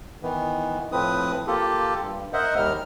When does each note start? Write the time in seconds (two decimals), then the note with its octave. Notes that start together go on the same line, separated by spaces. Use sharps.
0.23 D#3 E3 B3
0.92 A2 F3 C4 B4 D#6
1.47 A#3 F4 G4 A4
2.01 G2
2.33 A#4 C5 D#5 E5 F#5
2.57 D#2 G3 A#4 F6